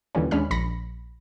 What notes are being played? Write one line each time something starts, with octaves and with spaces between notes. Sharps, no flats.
D#2 A#2 D3 E3 G3 C#4
D#2 G#3 C#4 D4 B5 F6
A#1 B5 A#6 C#7